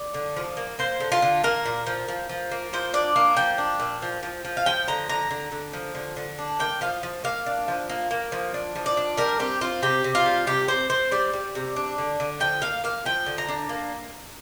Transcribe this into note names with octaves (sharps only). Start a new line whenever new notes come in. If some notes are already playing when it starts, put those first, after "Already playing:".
Already playing: D5
D3
F3
A#3
A#3 C5
D3
F4
D3
A#3 A#4
A#2
F3
F3
F3
A#3
F3 C5
D4 D5
A#3
F3 G5
D4
A#2
F3
F3
F3
F5
F3 G5
D3 A#5
D3 A#5
D3
D3
F3
D3
D3
D4
A#3 G5
F3 F5
F3
A#3 F5
D4
F3
A#3
A#3
F3
D4
F3
D5
D4
G3 A#4
C4 G4
C4 F4
C3 G4
C3
F4
G3
C3 G4
C4 C5
C4 C5
G3 D5
G3
C3
D4
D3
D3
F3 G5
A#3 F5
A#3 F5
F3 G5
D3
A#5
D4
A#3